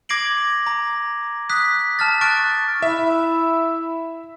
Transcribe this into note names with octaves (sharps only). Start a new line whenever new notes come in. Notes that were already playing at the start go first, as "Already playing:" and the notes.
D6 G#6 A#6 C7 D7 F#7
A#5
D#6 F#6 B6
A5 F6 A6
C#6 F6 F#6 A6 D7
E4 E5